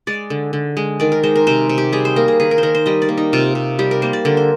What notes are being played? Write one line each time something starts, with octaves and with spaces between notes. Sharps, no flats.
G#3 D5
D3
D3
G#3
D#3 D5
A#4
G#3 C5
A#4
C3 C5
C3
G4
G3 G#4
C5
A#3 A#4
G#4
D#3 G#4
A#4
C5
D#3 A#4
C5
G3 D#5
D5
A#3
D#4
C3 F4
C3
G3 G4
A#4
A#3 C5
D5
D3 A#4
C5